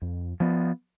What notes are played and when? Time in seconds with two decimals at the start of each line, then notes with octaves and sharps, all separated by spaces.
0.02 F2
0.40 F3 B3